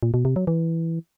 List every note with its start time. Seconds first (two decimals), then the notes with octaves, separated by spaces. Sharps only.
0.03 A#2
0.14 B2
0.25 C3
0.36 F#3
0.47 E3